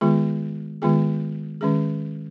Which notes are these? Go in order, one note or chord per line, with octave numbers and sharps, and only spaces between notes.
D#3 G#3 B3 F4 G#4
D#3 G#3 B3 F4 G#4
D#3 G#3 C#4 G#4